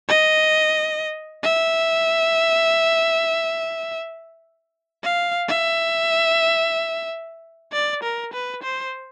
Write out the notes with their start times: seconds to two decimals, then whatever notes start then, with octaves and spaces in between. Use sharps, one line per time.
0.09 D#5
1.43 E5
5.04 F5
5.48 E5
7.73 D5
8.03 A#4
8.33 B4
8.63 C5